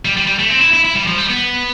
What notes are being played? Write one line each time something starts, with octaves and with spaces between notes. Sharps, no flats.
G3
G3
G3
A3
C4
E4
E4
E4
G3
F3
G3
B3